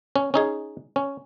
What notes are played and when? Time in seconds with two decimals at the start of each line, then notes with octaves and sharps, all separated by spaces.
0.16 C#4
0.34 C#4 D#4 G#4
0.96 C#4